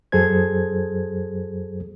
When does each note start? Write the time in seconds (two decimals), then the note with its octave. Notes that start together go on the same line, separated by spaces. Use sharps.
0.12 F#2 F#3 G#4 A4 C5 G#6